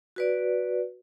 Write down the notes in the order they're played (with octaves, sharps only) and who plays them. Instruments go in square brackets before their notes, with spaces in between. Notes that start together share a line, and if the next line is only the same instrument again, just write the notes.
[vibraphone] F#4 B4 D5